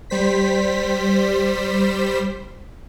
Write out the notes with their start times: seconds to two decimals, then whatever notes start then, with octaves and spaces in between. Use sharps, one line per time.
0.10 G3 C5 B6